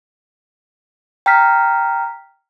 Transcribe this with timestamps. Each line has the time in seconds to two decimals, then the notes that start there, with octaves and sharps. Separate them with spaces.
1.26 G5 A#5 F6 B6